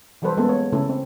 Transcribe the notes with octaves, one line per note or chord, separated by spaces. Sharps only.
E3 F#3 G3 A4 B4 C5
G#3 A#3 B3 C#4 G#4 A4
C#5
C#3 A3 C#4 E4 A4
C4